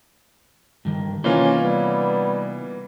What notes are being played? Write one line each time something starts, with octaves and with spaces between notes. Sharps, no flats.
G2 D#3
C3 E3 A#3 C#4 D#4 F4 C5
G3 B3